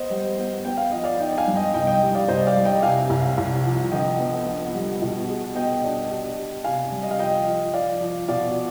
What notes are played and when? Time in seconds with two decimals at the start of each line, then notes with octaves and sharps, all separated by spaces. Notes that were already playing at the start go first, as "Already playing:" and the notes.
Already playing: B3 C5 D#5
0.10 G3
0.38 B3
0.65 B3 G5
0.77 F5
0.92 F3 D#5
1.04 D5 F5
1.19 D#4 D#5 G5
1.33 G5
1.38 F5 G#5
1.47 G2
1.56 D#5 G5
1.74 C2 D#5 G5
1.87 D#5 G5
2.02 G3
2.15 D5 F5
2.28 C2 C5 D#5
2.47 D5 F5
2.56 G3
2.65 D#5 G5
2.83 C3 F5 G#5
3.10 C2
3.38 C2
3.65 F3
3.92 D3 D#5 G5
4.19 B3
4.46 B3
4.74 G3
5.02 B2
5.28 G#4
5.55 B3 D#5 G5
5.84 D4
6.10 G4
6.38 G4
6.64 C3 F5 G#5
6.91 G3
7.03 D#5
7.11 F5
7.19 F3 D#5 G5
7.46 F3
7.74 F3 D5 F5
8.01 F3
8.28 B2 D5 F5